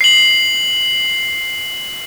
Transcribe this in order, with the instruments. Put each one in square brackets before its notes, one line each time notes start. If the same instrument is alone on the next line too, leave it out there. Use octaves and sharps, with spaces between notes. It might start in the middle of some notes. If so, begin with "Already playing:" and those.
[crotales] C7 F#7